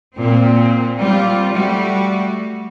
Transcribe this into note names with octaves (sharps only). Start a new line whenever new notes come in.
A#2 C4
G3 C4 F4
G3 A3 F#4